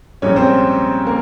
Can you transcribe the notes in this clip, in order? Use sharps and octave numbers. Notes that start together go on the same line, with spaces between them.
A#1 G#2 G3 C#4 C#5
C4 C5
A#3 A#4